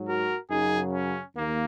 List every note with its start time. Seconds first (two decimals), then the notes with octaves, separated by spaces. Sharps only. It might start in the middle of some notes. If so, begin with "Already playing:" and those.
Already playing: G#2 F#3
0.08 F#4 A#4
0.51 F#2 C#3 F#3 D#4 G#4
0.94 C#4
1.37 D#2 A#3